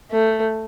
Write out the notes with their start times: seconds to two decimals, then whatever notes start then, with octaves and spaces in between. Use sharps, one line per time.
0.11 A3